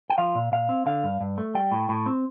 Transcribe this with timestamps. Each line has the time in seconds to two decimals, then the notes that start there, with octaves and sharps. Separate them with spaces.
0.10 G5
0.18 F3 F5
0.35 A#2
0.52 A#2 F5
0.69 C4
0.86 D3 F5
1.04 G2
1.21 G2
1.38 A3
1.55 G3 G5
1.72 A2
1.89 A2
2.06 C4